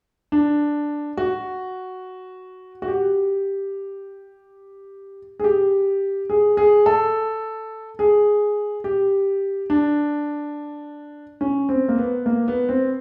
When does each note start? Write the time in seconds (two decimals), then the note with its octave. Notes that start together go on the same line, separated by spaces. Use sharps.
0.32 D4
1.17 F#4
2.82 F#4
2.88 G4
5.40 G#4
5.44 G4
6.30 G#4
6.57 G#4
6.86 A4
7.99 G#4
8.84 G4
9.70 D4
11.41 C#4
11.69 C4
11.89 A#3
11.98 B3
12.26 A#3
12.48 B3
12.69 C4